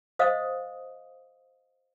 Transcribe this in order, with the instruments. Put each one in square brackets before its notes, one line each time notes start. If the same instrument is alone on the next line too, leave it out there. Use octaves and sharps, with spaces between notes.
[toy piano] C5 D#5 F5 D#6